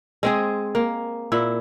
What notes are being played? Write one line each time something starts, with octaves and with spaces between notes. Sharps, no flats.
G#3 C4 G#4
A#3
A#2 E4